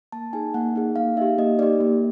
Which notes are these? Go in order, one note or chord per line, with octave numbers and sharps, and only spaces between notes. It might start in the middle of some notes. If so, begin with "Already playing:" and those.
A#3 A5
D#4 G#4 G#5
A#3 F#5
D#4 G#4
A#3 F5
D#4 G4 E5
A#3 D#5
D#4 G4 D5
A#3